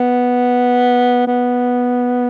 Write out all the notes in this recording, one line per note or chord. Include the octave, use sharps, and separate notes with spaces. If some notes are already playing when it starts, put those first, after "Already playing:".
Already playing: B3
B3